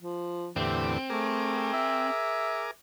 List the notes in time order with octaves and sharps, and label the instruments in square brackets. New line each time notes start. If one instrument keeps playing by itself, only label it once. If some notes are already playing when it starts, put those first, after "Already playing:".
[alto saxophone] F3
[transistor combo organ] E2 A2 D3 [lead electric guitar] C4 [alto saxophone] G4
[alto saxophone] A3 [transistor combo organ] G#4 A#4 D6
[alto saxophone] E5